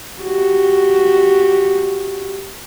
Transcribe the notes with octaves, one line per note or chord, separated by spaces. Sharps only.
F#4 G4